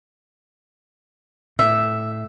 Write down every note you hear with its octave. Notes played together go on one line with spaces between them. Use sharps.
A2 E5